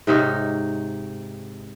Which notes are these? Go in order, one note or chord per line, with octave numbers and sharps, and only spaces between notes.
G#2 C3 D#4 C#5